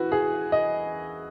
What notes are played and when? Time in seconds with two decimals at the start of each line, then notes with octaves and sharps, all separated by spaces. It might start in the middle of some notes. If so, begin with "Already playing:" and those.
Already playing: E4 F#4 B4
0.12 G#4
0.52 D#5